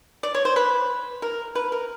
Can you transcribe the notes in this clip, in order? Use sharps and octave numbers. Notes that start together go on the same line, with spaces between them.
D5
C#5
C5
B4
A#4
B4
A#4